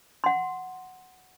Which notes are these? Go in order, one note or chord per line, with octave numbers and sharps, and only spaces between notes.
F#5 C6